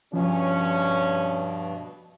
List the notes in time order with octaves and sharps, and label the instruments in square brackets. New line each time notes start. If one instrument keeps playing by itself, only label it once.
[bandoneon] G2 B2 [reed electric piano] F3 [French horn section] C#4